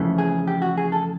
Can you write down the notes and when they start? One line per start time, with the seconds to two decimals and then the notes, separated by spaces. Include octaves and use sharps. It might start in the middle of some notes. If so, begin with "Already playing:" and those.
Already playing: F2 C#3 E3 A3
0.18 G#4
0.47 G4
0.62 F#4
0.77 G#4
0.92 A4